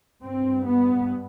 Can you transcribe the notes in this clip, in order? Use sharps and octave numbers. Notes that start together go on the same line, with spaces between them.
G2 C4
B3